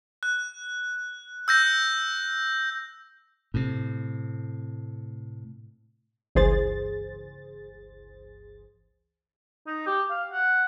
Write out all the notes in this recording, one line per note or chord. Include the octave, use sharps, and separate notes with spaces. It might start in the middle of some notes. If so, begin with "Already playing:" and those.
F#6
E6 G6 A#6
A2 C3
G1 C#2 E3 G#4 C5 A6
D#4
G4
F5
F#5